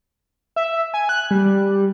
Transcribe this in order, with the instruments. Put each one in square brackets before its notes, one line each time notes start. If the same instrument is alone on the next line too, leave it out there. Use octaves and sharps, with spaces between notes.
[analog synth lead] E5
G#5
F#6
G3